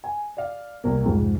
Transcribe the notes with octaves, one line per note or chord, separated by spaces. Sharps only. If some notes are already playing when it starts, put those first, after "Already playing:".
G#5
D5 F5
C2 A#3
C2 F2 G#2 G#3